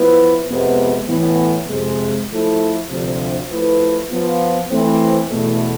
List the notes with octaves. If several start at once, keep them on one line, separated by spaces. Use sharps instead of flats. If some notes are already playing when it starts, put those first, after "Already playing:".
Already playing: F3 B3 E4 B4
F2 C3 G#3 B3
A2 E3 B3
F2 C3 G#3
F3 A3 E4 A4
D2 C3 F3
F3 A3 E4 B4
F3 B3 F4
E3 A3 C4
E2 B2 A3